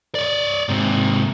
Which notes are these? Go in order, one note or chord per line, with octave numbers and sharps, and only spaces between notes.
C#5 D5
G#2 C3